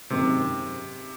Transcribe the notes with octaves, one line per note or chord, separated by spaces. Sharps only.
G#1 F#2 C3 D#3 G#3 C4